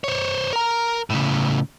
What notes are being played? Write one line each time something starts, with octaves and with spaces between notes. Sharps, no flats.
C5 C#5
A#4 A#5
A2 C#3